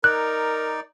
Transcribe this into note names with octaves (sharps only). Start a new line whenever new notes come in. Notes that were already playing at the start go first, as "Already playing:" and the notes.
D#4 A#4 D5 F#6